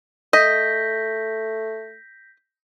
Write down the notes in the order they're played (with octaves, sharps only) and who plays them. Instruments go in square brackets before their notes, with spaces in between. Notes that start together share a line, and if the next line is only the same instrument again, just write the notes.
[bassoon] A3 [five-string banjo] D#5 [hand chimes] G6 A#6 B6